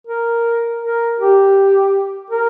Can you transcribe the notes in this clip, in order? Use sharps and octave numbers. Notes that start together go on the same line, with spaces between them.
A#4
A#4
G4
A#4